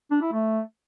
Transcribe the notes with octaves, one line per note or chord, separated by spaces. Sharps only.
D4
E4
A3